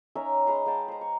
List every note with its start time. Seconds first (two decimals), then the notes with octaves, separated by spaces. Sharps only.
0.15 C#4 D#4 A#4 E5
0.46 G#3 B4 A#5 C6
0.66 G#3 F5 G5 A5
0.88 C5 A#5
1.01 C#6